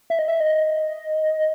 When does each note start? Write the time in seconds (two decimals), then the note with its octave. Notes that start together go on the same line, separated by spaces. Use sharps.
0.10 E5
0.19 D#5
0.28 E5
0.40 D#5